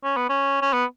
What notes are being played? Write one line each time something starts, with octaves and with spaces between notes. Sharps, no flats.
C#4
B3
C#4
C#4
B3